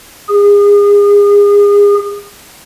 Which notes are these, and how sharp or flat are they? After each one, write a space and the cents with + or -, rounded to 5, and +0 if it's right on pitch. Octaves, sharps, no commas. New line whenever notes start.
G#4 -30